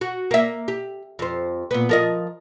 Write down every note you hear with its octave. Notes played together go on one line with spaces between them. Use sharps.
F#4
A#3 E5
G4
F2 C5
A#2 B3
F3 A#4 D#5